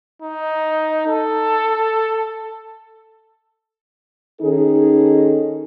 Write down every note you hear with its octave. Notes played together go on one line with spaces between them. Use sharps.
D#4
A4
D#3 C#4 D#4 G#4 A4